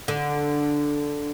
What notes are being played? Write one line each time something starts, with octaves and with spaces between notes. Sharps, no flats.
D3